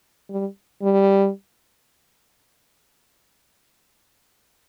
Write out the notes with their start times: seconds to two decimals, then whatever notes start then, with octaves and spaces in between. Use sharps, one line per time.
0.30 G3
0.82 G3